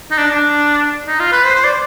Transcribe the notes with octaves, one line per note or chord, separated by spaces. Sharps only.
D#4
D4
D4
D#4
F4
B4
C5
C5
D5